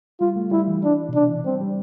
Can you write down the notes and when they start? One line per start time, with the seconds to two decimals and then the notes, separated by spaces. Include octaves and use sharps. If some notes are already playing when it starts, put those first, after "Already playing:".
0.21 G3 F4
0.36 A3
0.51 G3 E4
0.68 E3
0.84 D4
1.09 B2
1.14 C3 D4
1.30 E3
1.45 G3 C4
1.61 G3